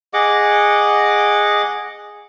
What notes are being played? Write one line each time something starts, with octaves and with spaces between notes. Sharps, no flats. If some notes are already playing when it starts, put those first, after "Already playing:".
G#4 D#5 F#5 D6